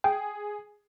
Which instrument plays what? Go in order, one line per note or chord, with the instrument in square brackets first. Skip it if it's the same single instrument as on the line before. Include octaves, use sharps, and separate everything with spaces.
[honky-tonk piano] G#4 [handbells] G5